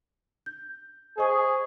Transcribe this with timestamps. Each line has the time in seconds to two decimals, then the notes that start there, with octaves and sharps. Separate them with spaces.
0.46 G6
1.18 G#4 C5 D#5 C#6